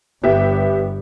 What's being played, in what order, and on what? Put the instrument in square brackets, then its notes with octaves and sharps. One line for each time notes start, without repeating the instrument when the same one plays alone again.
[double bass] G1 [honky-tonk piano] B3 G4 E5